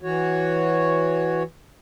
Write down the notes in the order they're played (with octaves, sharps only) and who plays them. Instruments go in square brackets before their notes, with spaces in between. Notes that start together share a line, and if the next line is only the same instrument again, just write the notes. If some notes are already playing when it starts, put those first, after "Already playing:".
[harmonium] E3 F#4 C#5